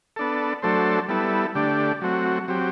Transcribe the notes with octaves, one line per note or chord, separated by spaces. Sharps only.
B3 D4 A4
F#3 A3 D4 A4 C5
G3 B3 E4 A4
D3 A3 D4 G4
F#3 A3 C4 F#4
F#3 C4 G4